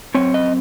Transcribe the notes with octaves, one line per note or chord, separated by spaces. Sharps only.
F#2 F3 C4 C#5
D#5